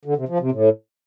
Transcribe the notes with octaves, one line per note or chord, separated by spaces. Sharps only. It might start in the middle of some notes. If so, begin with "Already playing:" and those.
D3
C3
F3
C3
A2